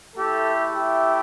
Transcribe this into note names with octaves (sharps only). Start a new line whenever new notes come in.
A3 E4 G4 A4
G4